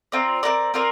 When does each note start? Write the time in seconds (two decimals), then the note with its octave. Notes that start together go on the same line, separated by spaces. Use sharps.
0.12 C4 F4 A#4 D5
0.43 C4 F4 A#4 D5
0.74 C4 F4 A#4 D5